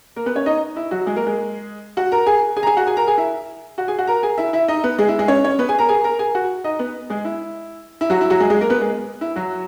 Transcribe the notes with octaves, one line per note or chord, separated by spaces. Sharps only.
A#3 A#4
B3 B4
C#4 C#5
D#4 D#5
E4
F#3 F#4
G#3 G#4
A#3 A#4
G#3 G#4
F#4 F#5
A#4 A#5
G#4 G#5
G#4 G#5
A#5
G#4 G#5
F#4 F#5
G#4 G#5
A#4 A#5
G#4 G#5
E4 E5
F#4 F#5
G#4 G#5
F#4 F#5
A#4 A#5
G#4 G#5
E4 E5
E4 E5
D#4 D#5
B3 B4
G#3 G#4
E4
G#3 G#4
C#4 C#5
C#4 C#5
B3 B4
G#4 G#5
A#4 A#5
G#4 G#5
A#4 A#5
G#4 G#5
F#4 F#5
D#4 D#5
B3 B4
G#3 G#4
E4
E4
F#3 F#4
E4
F#3 F#4
G#3 G#4
G#3 G#4
A#3 A#4
B3 B4
G#3 G#4
E4
F#3 F#4